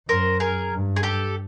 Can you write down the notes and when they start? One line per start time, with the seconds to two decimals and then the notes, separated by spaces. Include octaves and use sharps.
0.09 F#2 A#4 C5
0.40 G#4 A#4
0.72 G2
0.96 G#4
1.03 G4 A4